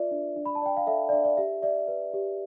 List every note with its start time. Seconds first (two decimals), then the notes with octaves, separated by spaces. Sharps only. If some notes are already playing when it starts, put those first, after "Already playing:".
Already playing: F4 B4 D5 E5
0.11 D4
0.36 D4
0.46 B5
0.55 A5
0.62 D5 G5
0.77 F5
0.87 A4 E5
1.09 D5
1.12 D4 E5
1.24 D5
1.37 G4 E5
1.63 D5 E5
1.88 B4
2.14 G4